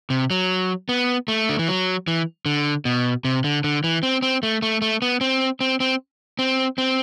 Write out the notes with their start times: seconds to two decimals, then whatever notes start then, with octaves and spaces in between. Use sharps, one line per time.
0.10 C3
0.31 F#3
0.89 B3
1.28 A3
1.49 D3
1.59 E3
1.68 F#3
2.08 E3
2.46 D3
2.85 B2
3.25 C3
3.44 D3
3.64 D3
3.84 E3
4.03 C4
4.22 C4
4.43 A3
4.62 A3
4.82 A3
5.02 B3
5.21 C4
5.61 C4
5.80 C4
6.39 C4
6.78 C4